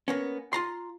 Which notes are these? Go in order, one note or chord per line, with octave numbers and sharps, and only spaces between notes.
A#3 B3 C#4
F4 A#5 C6